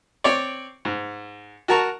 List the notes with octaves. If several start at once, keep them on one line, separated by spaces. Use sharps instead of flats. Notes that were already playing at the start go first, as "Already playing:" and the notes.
C4 C#5 D5
G#2
F#4 A#4 A5 A#5 C#6